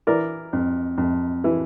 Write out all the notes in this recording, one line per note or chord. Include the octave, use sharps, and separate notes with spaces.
E3 A#4 D5
F2
F2
E3